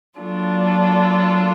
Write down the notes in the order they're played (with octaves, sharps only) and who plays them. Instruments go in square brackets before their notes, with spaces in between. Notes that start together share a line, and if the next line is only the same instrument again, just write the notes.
[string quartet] F#3 A#3 D4 F4 A4